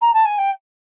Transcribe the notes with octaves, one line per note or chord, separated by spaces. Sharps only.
A#5
A5
G#5
G5